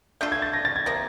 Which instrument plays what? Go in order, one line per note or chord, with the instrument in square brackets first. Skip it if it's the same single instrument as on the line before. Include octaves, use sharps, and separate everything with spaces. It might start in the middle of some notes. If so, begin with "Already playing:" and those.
[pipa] A3 D4 F4 A4 [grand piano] G6
[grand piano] G#6
A6
A#6
A6
G#6
[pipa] C3 F3 A#3 [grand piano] A#6